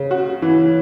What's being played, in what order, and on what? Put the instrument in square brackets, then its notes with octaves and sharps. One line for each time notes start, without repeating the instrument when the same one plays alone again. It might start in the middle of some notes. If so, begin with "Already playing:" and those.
Already playing: [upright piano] C#3
F#4
E3